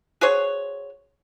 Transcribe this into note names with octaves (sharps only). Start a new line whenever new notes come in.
F#4 G#4 C5 C#5